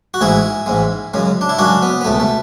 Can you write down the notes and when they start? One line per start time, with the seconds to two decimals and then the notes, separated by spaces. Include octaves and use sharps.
0.14 F#4
0.21 A1 G#2 G#3 E4 G#4
0.66 A1 G#2 G#3
1.14 F#2 C#3 G#3
1.41 D4
1.49 E4
1.59 F#2 C#3 G#3 D4 F#4
1.82 B3
2.01 B3
2.05 C#2 B2 A3
2.20 A3